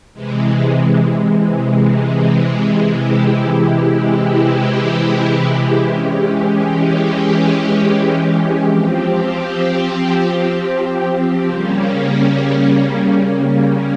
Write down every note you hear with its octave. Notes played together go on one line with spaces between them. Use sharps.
C3 E3 G#3
C3 E3 G#3 E4 G4
E3 G#3 C#4 G4
F3 C4 G4
C#3 G3 A#3 C#4